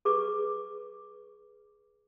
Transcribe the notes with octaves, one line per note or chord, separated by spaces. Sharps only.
G#4 B4 C#6 D6